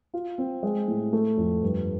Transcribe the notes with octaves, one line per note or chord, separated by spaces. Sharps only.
F4
C4
G#3
A2
A3
F2
G2